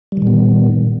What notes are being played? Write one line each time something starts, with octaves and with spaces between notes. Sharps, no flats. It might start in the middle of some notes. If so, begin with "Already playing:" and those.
A#2 D#3 G3 B3